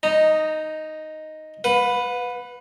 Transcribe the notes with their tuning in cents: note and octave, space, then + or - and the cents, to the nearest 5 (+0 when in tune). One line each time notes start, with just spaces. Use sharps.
D#4 +0 A#5 -20
B4 +5 F#5 -45